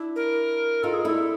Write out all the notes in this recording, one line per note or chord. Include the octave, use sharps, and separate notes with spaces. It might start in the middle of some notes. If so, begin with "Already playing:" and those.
Already playing: D4 E4
A#4
D#4 F4 A4
G#4
D4 E4 A4